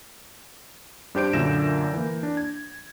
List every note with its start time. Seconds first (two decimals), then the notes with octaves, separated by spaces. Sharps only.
1.15 G2 D4 G4 C5 G6 D7
1.33 F#2 A#2 D3 E5 A#6 E7
1.93 E3 A#3
2.23 D4
2.37 G#6